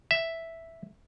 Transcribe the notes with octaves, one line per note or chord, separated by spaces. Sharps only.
E5